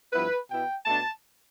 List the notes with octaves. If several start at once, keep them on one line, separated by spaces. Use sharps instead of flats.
G2 F3 B3 E4 B4
B2 B3 E4 G5
B2 A3 D4 A5